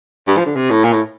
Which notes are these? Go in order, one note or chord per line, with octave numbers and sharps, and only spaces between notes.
G2
F3
D3
C3
A2
A#2
A2